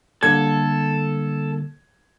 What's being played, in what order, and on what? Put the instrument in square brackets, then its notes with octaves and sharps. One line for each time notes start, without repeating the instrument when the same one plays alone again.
[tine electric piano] D3 G3 A#3 [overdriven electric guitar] A4 [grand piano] G#6